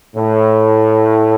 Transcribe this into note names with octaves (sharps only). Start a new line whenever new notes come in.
A2